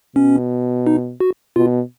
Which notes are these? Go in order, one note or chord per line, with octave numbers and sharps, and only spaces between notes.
B2 C#4
D#4
F#4
B2 F4